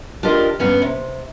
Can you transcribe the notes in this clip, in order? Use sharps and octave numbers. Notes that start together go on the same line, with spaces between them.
D4 F4 G4 A#4 D#5
G2 B3 C#4 A#5
C3